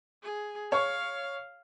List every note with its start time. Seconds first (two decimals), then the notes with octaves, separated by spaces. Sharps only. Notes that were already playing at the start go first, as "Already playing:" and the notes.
0.23 G#4
0.72 C#5 F5 C#6